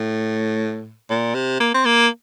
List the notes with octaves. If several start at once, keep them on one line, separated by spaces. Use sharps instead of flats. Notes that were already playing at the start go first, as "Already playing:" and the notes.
Already playing: A2
A#2
C3
A#3
C4
A#3